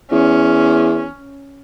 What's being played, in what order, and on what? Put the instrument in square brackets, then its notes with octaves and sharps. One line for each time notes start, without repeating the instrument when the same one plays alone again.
[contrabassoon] E2 [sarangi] C#4